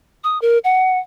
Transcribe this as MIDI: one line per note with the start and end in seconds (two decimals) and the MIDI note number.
0.24 0.40 87
0.42 0.58 70
0.64 0.99 78